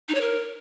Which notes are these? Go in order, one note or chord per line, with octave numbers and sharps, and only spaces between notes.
D#4
C#5
A#4